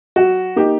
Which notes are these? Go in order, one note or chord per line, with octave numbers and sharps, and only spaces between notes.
F#3 F#4
A#3 D#4 G4